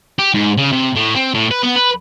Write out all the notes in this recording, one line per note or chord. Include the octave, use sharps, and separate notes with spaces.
G4
G#2
C#3
C3
A2
C4
A2
B4
B3
B4